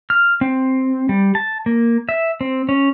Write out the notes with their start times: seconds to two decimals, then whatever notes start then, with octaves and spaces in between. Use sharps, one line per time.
0.10 F6
0.41 C4
1.09 G3
1.35 A5
1.66 A#3
2.09 E5
2.41 C4
2.69 C#4